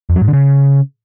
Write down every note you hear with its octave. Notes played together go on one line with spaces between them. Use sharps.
F2
F#3
G#2
D3
C#3